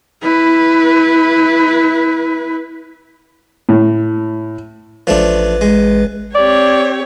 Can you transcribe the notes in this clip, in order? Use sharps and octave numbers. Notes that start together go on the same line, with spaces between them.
E4 B4
A2
A1 F3 A3 D4 B4
G#3
C4 G4 C#5 D5